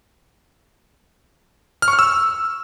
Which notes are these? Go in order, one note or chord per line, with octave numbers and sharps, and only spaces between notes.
F6
C#6
F6
E6